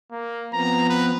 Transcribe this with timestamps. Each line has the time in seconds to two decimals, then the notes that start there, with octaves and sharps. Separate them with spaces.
0.12 A#3
0.53 F3 B3 C4 A#5
0.90 B4